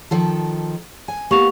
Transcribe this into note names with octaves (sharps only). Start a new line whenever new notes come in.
D#3 F3 A4
G#5
A#3 B3 G4 C#6 F7